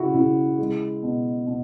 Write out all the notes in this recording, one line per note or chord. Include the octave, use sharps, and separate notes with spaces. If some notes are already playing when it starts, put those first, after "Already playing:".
Already playing: C#3 E4 F#4
C#3 E4
G#3
B2
B2